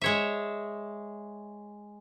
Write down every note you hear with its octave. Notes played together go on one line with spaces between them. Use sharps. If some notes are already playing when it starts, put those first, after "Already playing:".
G#3 C#5 E5